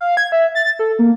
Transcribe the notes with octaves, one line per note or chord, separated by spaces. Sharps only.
F5
G#6
E5
A6
A4
A#3